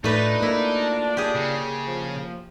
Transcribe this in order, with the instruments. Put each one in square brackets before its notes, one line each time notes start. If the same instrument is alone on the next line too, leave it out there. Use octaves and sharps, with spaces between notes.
[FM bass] A2 [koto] A3 B4 [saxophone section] D4 F4 D5 [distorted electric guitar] D#4
[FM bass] A#3 [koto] E4
[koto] G4 G#4
[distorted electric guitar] C#3
[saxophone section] F3